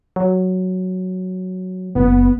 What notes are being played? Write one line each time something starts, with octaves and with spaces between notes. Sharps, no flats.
F#3
F#1 B3